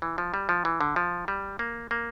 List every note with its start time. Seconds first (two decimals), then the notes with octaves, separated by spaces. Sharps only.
0.02 E3
0.18 F3
0.34 G3
0.49 F3
0.65 E3
0.81 D3
0.96 F3
1.28 G3
1.59 A#3
1.91 A#3